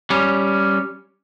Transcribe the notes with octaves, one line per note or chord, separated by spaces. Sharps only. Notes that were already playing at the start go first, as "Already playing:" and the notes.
G3 C#4